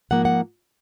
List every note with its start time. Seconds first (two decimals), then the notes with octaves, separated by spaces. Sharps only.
0.11 G#2 F3 A#3 F#5
0.25 F#5